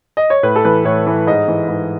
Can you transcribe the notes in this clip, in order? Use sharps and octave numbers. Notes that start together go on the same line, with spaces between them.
D#5
C#5
A2 B4
A4
E3 B4
A2 C#5
E3
G#2 D#5
E3
G#2